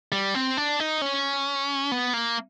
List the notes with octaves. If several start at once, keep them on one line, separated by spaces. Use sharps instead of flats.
G3
C4
D4
D#4
C#4
B3
A#3